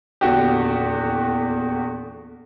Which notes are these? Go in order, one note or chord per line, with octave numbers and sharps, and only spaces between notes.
D#1 E2 D3 F#4 G4